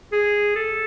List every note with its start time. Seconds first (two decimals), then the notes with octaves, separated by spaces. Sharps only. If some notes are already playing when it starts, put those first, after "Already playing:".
0.12 G#4
0.56 A4